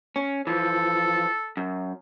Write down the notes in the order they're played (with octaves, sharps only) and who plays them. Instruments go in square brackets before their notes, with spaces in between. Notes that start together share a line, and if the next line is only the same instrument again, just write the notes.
[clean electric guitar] C#4
[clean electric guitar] E3 F3 [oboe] A4
[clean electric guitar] F#2